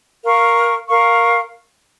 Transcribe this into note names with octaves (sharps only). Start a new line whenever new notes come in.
A#4 F5 C#6
A#4 F5 C#6